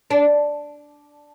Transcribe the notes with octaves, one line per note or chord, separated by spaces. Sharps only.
D4